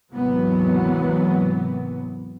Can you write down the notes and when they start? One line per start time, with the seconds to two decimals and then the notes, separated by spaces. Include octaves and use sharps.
0.12 D#2 G#2 C3 E3 F#3 B3